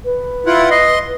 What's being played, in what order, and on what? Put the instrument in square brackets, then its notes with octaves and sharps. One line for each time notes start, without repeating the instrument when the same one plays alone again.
[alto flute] B4
[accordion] E4 F4 F#5
D#5 C6